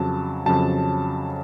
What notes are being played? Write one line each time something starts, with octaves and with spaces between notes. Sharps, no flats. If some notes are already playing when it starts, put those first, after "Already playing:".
Already playing: F2 C#3 F#3 A5
F2 C#3 F#3 A5